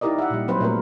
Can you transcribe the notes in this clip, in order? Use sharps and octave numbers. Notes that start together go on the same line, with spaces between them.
D#4 E4 G4 A#4 D5 D#5
E5 F#5
A#2 G3
F#3 C4 B4 C5
A#2 A3 C4 D4 A#4 B4